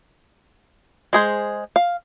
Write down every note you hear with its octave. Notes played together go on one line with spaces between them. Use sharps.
G#3 G#4 C5
F5